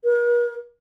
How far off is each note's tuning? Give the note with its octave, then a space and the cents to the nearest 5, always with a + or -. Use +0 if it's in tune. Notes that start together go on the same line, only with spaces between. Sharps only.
A#4 +45